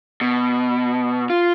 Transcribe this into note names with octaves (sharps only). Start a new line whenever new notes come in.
B2
F4